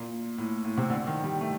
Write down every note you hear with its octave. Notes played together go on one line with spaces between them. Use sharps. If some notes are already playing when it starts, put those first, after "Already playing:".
Already playing: A#2
A2
A2
C3
D3
D#3
G3
A3